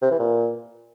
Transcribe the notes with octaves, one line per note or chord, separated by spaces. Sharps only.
C3
E3
A#2